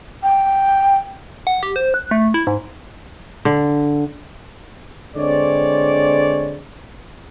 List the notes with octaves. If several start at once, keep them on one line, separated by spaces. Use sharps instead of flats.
G5
F#5
G4
C5
F#6
A3
E4
G#2
D3
D3 G#3 C4 C#5 D5